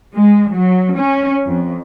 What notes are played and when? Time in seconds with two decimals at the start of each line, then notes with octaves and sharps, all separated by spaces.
0.14 G#3
0.51 F#3
0.95 C#4
1.46 F2